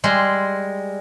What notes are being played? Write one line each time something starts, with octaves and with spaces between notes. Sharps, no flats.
G3 G#3 C6